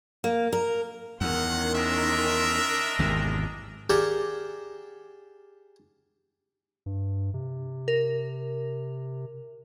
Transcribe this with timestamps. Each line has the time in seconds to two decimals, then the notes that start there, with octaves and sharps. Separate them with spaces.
0.24 A#3
0.52 A#4
1.21 E2 D#3 C#4 F#5 C6
1.75 D4 A#4 D#5 E5
2.99 G#1 E2 C3
3.90 G4 G#4 A#4 D5 E5 F#5
6.86 G2
7.34 C3
7.88 A#4